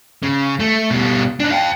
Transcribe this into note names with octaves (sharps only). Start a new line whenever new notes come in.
C#3
A3
B2 G3
D4 D#4
F5 G5